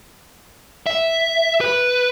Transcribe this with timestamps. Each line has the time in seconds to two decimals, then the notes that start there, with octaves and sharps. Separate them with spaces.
0.86 E5
1.61 B4